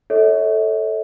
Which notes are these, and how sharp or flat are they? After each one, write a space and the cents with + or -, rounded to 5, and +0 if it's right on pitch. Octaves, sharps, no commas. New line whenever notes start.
A4 +0 C#5 +10 E5 -45